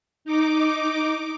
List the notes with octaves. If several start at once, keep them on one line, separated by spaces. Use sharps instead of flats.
D#4 D6